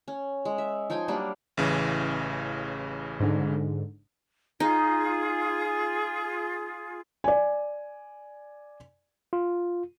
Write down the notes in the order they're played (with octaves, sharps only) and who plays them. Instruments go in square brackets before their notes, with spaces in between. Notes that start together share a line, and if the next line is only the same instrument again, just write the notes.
[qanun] C#4
G#3
E5
F3 D#4 G5 G#5
F#3 G3 A#3 D4
[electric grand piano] A1 C#3 E3
[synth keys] G#2 D3
[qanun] D#4 [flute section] F4 G#4
[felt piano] D5 G#5
[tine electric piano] F4